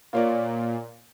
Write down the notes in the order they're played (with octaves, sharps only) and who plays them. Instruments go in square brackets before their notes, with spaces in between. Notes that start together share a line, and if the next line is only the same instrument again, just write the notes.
[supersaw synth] A#2 [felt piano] F4 C#5 D5